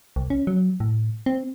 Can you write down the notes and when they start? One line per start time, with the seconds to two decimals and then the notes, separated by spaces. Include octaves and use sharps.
0.16 C2
0.30 C#4
0.47 F#3
0.80 A2
1.26 C4